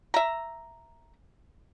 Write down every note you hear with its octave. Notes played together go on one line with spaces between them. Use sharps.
E5 A#5